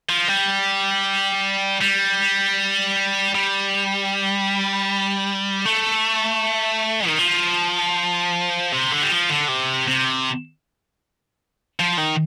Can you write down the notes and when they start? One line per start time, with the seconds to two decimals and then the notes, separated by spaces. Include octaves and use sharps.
0.09 F3
0.28 G3
1.81 G3
3.35 G3
5.66 A3
7.07 D#3
7.19 F3
8.72 C3
8.92 D3
9.03 G3
9.11 F3
9.30 D3
9.48 C3
9.88 C3
11.80 F3
11.98 D#3